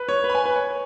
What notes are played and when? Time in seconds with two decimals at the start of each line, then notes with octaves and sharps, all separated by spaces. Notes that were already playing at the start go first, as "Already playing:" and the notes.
Already playing: B4
0.09 C#5
0.24 B4
0.30 B5
0.35 G#5
0.45 B4
0.56 C#5
0.70 C#5